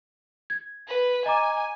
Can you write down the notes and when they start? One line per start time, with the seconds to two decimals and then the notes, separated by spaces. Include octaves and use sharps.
0.50 G#6
0.88 B4
1.26 D#5 G#5 A#5 D6